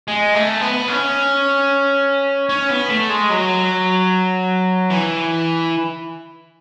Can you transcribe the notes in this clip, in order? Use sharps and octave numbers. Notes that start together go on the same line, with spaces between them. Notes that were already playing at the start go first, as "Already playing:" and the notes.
G#3
A3
B3
C#4
C#4
B3
A3
G#3
F#3
E3